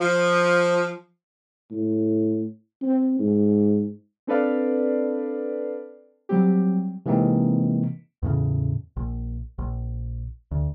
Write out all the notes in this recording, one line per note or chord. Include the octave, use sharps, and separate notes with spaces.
F3
A2
C4
G#2
C4 D4 A4 B4 D5 F5
F#3 G3 C4 G4
C3 E3 G#3 A#3 C4 D#4
E2 A2 C#3
A#1
A#1
D2